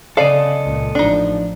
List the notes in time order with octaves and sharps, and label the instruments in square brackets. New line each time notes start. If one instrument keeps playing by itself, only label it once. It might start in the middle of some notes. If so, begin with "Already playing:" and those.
[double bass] C#3 [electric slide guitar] A4 D#5 [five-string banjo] D5 F5
[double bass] C#2 A#2
[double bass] A1 F3 [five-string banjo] D4 D#4